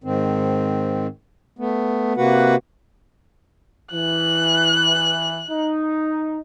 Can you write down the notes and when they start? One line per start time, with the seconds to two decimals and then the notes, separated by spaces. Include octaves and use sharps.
0.04 G#2 D#3 C4
1.59 A3 B3
2.17 C3 A#3 F#4 B4 F#5
3.93 E3 F#6
5.49 D#4